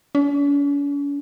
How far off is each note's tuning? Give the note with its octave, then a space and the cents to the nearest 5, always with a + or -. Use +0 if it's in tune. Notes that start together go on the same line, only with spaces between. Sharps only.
C#4 +45